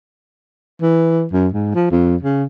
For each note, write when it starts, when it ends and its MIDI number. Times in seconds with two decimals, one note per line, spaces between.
0.82 1.26 52
1.33 1.48 42
1.54 1.73 44
1.75 1.90 53
1.91 2.16 41
2.23 2.44 49